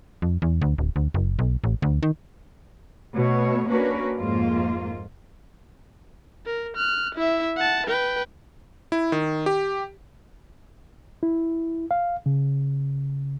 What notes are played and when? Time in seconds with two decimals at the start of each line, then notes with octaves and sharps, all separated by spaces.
0.22 F2
0.42 E2
0.61 D2
0.78 D1
0.96 D2
1.14 F#1
1.39 B1
1.64 A1
1.82 D2
2.03 D#3
3.16 B2 A3 C#5
3.70 A#3 C#4 D4 F#4 A#4 B4
4.17 F2 G#2 A#3 F4
6.46 A#4
6.77 F6 F#6
7.15 E4 E5
7.57 F#5 A5
7.87 B4 G5
8.92 E4
9.12 D#3
9.46 G4
11.23 E4
11.91 F5
12.26 C#3